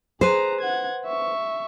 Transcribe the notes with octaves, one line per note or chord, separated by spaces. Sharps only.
G#4 B4 C5 A#5
F#5 G#6
E5 C#6